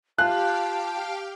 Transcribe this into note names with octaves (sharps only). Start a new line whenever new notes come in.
F4 G4 F5 G5 A5 F#6